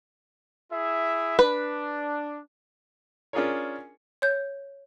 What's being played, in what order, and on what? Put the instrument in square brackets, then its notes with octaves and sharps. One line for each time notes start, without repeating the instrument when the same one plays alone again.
[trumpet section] E4 G#4 E5
[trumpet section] D4 [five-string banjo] B4
[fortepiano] C#4 D4 F4 G#4 A#4 C#5
[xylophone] C#5 G6